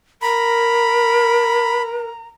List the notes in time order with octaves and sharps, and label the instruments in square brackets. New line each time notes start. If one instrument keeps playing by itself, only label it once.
[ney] A#4 [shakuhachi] A#5 [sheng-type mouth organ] B5